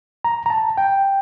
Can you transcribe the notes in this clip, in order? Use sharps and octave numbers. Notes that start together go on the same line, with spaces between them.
A#5
A#5
A5
G5